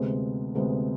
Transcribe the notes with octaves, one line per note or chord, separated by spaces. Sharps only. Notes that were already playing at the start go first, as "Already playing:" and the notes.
Already playing: D2 C3 G#3 B3
D2 C3 G#3 B3